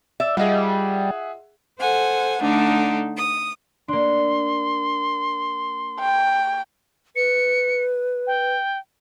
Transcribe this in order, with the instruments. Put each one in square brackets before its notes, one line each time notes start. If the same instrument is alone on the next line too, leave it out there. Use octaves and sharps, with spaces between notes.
[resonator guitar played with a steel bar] D5 E5
[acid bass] G3 [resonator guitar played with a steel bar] F4 D#5 [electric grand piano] G#4 E5 F#5
[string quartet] A4 C5 F#5 G#5
D3 A3 D4 D#4
D#6
[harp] A#3 D4 [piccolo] C6
[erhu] G5
[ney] B4 [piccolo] C#7
[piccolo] G5